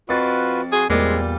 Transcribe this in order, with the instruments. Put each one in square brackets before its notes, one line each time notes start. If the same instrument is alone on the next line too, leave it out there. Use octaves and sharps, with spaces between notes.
[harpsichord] F2 A5 [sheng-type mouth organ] F4 F#4 B4
[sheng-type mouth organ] F#4 C6 [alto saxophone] G#4
[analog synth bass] E2 [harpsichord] A#2 G3 [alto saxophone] G#3 [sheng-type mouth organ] C4